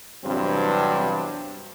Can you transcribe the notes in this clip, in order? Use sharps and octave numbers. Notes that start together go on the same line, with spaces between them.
E2 G2 C3 F#3 C4